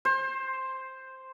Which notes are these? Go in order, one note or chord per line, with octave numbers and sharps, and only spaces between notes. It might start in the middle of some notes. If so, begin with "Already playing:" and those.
C5